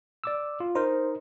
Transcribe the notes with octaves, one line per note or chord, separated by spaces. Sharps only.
D5 D6 E6
F4
D#4 A#4 C5